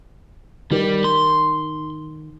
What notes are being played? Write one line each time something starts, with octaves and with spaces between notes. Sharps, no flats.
D#3 G3
C6